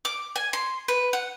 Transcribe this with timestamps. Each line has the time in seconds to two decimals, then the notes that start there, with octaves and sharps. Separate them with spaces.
0.05 D6
0.36 G#5
0.53 C6
0.88 B4
1.13 F#5